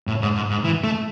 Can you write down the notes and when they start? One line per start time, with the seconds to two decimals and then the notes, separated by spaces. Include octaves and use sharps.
0.07 A2
0.22 G#2
0.35 G#2
0.50 G#2
0.64 E3
0.84 A3